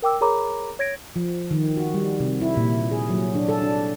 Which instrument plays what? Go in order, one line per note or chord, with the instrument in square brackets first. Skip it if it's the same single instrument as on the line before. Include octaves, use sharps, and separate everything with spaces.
[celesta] A#4 G5 D6 E6
G#4 A#4 C#5 A#5 B5 D6
C#5 G#6 A#6 D7
[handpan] F3
D#3
F#4
G3
C3
E4
A#2
G#4
F#3
D4
A4
D4